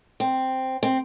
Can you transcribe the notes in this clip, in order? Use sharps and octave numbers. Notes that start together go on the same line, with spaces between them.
C4
C4